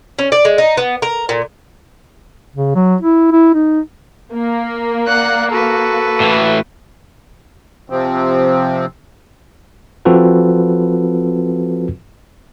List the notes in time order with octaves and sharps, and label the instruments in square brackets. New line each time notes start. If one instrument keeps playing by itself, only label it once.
[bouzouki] C#4
D5
G#3
D#4
B3
A#4
A#2
[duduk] C#3
F#3
E4
E4
D#4
[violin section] A#3
[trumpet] D5 [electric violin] F#5 F#6
[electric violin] F#4 B4 [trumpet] A4
[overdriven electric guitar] A2 E3
[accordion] C3 F3 C4
[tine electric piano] F3 C4 F4 F#4 A4 B4